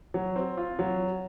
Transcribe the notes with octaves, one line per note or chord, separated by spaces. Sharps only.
F#3
C4
F4
F#3